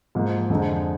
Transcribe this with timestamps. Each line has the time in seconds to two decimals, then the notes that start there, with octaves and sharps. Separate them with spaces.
0.15 G#2 F3 A#3 D#4
0.50 F2 D3 G#3 D#4